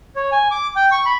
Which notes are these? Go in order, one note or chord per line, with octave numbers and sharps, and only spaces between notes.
C#5
G#5
D6
G5
C#6
B5